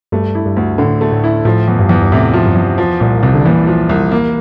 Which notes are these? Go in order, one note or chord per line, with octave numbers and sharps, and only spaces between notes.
G2 A3
E4
G2
D2
A2 D3
A3
A2
E4
A2 F3
E2
G2
E2
G2
A2 C3
F3
G2
E2
F3
C2 A#2
C2 C3
D3
A#2 E3
F3
C2
A#3